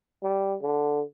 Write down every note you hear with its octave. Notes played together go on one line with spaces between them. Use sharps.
G3
D3